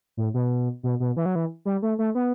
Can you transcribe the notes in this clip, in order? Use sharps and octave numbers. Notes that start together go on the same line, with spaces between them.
A2
B2
B2
B2
E3
F#3
E3
G3
A3
A3
B3